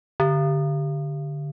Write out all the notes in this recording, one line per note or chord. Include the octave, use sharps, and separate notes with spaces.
D3